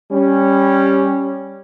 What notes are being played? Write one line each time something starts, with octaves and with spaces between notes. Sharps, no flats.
G3 C#4